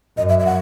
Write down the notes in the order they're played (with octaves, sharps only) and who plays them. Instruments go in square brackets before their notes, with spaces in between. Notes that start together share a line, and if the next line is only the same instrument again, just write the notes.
[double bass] F#2 [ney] D#5
[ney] E5
E5
F#5